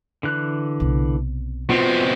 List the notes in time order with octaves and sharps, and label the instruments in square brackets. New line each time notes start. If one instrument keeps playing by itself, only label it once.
[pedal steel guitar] D3 E3 F#6
[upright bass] B1 C3
[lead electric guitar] B2 C4 [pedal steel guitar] F4